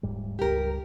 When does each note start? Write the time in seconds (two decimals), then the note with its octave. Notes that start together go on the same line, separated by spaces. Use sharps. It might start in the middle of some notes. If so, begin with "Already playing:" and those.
0.03 D#1 G#2 G3
0.39 C#2 G2 G4 A#4